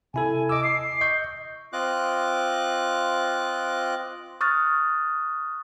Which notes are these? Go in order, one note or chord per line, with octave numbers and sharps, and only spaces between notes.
C3 E4 A4 G#5
D#5 D6 E6
C7
D#5 C#6 G6
C4 F4 D#5 D6 F#6
C#6 D#6 F6 F#6 A6